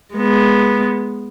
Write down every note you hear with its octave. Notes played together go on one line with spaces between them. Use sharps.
G#3 B3